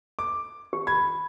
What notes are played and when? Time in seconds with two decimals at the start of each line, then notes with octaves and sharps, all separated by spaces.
0.19 D6
0.73 G4
0.87 B5 G#6